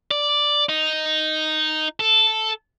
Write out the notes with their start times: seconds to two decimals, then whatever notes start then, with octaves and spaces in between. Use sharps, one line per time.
0.11 D5
0.69 D#4
2.00 A4